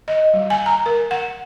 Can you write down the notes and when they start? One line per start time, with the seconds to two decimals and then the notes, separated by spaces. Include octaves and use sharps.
0.08 D#5
0.34 G3
0.50 G#5
0.66 A#5
0.86 A#4
1.11 F#5